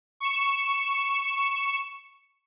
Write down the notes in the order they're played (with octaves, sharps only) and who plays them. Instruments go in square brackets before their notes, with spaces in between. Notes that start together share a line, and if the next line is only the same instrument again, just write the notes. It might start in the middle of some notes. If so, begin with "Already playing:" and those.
[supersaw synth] C#6 E7